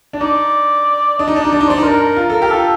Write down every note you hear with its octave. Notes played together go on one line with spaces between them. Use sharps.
D4
D#4 D5
D4 D#5
D#4
D4
D#4 D5
D4
D#4
D4 C5
D#4
D4 A#4
A#4
F4
A4
A#4
G4
F4 A4